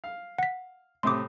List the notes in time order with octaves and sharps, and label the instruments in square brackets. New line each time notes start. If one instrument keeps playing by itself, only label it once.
[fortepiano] F5
[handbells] F#5 B6
[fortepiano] A2 C3 D#6 [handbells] C6 D6